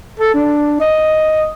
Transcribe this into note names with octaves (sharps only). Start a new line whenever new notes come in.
A4
D4
D#5